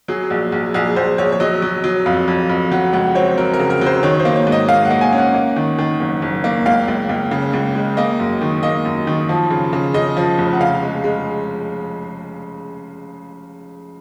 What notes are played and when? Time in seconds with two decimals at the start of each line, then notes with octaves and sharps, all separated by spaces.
0.08 F#3 G#4
0.30 A#1
0.52 A#1
0.74 A#1 G#4
0.96 A#1 C5
1.18 A#1 C#5
1.32 C#5
1.40 F#3 D#5
1.62 F#3
1.84 F#3
2.06 F2 F5
2.28 F2
2.49 F2
2.72 F#3 F#5
2.93 C#2 F#5
3.15 C4 C#5
3.37 F#3 A#4
3.54 A#4
3.59 C#3
3.70 A#4
3.81 F#3 C5
4.03 D#3 C#5
4.20 C5
4.25 A#3
4.36 C#5
4.47 G#2
4.52 D#5
4.69 A#3 F5
4.85 F#5
4.90 A#3
5.01 G#5
5.13 C#4
5.18 F#5
5.35 A#3
5.56 D#3
5.78 D#3
6.00 F#1
6.22 F#1
6.44 A#3
6.66 C#2 F5
6.88 C#2
7.09 C#2
7.31 C#3
7.53 C#2
7.75 G#3
7.97 A#3 D#5
8.19 F#2
8.42 D#3
8.63 A#3 D#5
8.85 F#2
9.07 D#3
9.29 F3
9.50 C#3
9.73 C#3
9.94 C#3 D#5
10.17 F3
10.38 F1
10.53 F#5
10.60 C#3 F5
10.82 G#3
11.04 G#3